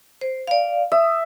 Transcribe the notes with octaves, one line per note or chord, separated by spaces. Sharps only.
C5
D5 F5
E5 D#6